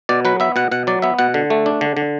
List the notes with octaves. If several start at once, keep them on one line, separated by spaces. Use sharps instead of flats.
B2 D5
F#3 B4
B3 E5
B2 F#5
B2 F#5
F#3 D5
B3 E5
B2 F#5
D3
A3
D4
D3
D3